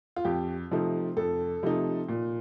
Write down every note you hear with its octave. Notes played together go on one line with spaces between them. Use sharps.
F4
F2 G4
C3 F3 A3 D#4
F2 A4
C3 F3 A3 D#4
A#2